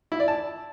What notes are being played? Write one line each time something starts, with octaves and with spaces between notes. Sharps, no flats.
E4
D5
A5